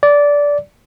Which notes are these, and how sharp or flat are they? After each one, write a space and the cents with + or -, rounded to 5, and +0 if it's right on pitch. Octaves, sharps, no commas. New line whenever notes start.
D5 -15